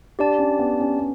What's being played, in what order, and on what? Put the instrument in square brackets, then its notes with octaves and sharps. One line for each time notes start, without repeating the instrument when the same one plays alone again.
[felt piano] D4 [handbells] G4 D5 A5
[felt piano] C#4
B3
C#4
B3